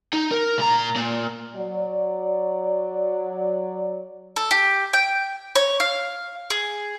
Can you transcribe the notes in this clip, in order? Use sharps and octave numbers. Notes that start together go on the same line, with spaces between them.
D#4
A#4
A#2 A#5
A#2
F#3 D5
A4
G4
G5
C#5
F5
G#4